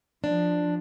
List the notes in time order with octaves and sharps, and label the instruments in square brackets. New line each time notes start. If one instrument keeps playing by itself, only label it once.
[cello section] F3 [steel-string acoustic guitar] D4